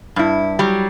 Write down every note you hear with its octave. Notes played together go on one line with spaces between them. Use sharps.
G2 E4
F#3 G3